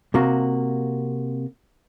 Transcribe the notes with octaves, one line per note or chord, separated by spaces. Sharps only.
C3 A#3 F#4